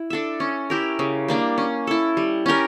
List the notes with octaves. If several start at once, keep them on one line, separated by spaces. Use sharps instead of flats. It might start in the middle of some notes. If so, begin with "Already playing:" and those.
Already playing: E4
D4 A4 E5
C#4
E4 G4 A#4
C#3
G3 A#3 D4
C#4
E4 A4
G3
C#4 G4 A#4